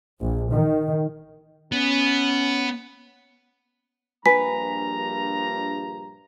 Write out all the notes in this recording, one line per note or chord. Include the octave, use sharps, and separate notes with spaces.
A#1
D#3
B3 C#4
A#1 G2 B4 G#5 A#5 B6